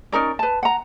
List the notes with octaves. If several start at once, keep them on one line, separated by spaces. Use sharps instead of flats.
C#4 D#4 A#4 D5
B4 A5
F#5 A#5